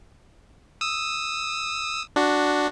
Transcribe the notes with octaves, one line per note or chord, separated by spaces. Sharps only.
D#6 E6
D4 F#4